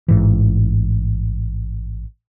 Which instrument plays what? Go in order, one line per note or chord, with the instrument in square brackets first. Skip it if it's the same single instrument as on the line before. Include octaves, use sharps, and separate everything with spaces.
[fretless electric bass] A1 G#2 E3